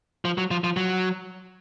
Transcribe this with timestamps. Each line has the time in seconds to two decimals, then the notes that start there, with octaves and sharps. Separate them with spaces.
0.25 F3
0.38 F#3
0.51 F3
0.64 F3
0.77 F#3